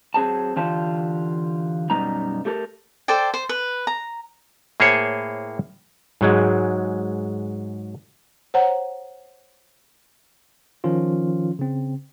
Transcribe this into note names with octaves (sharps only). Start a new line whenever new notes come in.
F#3 C4 G#4 C5 A5
D3 E3 F4 G4 A5
F#2 B2 G3 B3 D#4 A#5
A3 G4 A4 A#4
A4 C5 D5 G5
C5
B4
A#5
A2 A#3 G#4 C5 C#5 G#5
G#2 F#3 G#3
C5 C#5 F#5 A#5
D#3 F3 C#4 F4
C#3 C4